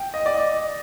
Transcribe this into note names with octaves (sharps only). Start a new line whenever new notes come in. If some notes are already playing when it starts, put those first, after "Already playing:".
Already playing: G5
D#5
D5
D#5